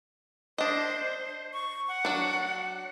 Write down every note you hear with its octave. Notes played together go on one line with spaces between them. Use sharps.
D4 C5 D#5
C#6
F#5
F#3 D4